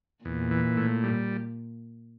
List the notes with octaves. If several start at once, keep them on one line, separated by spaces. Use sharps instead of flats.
E2 A#2
E3
A2
G3